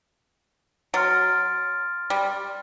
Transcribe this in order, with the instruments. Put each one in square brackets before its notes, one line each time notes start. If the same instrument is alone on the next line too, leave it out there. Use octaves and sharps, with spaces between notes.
[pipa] F#3 [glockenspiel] C6 F6 A6 D7
[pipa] G3